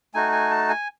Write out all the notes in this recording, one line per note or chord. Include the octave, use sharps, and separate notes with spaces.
A3 D#4 F#4 G#5
G#5
A5
G#5